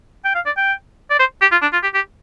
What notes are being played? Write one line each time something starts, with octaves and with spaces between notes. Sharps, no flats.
G5
F5
D5
G5
D5
C5
G4
F4
D4
F4
G4
G4